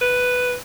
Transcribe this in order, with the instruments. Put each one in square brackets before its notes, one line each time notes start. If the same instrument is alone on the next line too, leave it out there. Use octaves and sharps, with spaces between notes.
[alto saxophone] B4